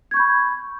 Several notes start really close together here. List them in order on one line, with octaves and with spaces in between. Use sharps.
G#6 C#6 G6 B5